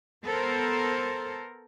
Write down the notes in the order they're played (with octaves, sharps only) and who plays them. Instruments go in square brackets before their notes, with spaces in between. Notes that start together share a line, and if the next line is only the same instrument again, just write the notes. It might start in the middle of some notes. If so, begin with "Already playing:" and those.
[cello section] B3 A4 A#4 C5